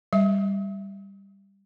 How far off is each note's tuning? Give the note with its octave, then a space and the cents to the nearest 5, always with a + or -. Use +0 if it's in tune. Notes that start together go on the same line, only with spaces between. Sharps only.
G3 +10 E5 +10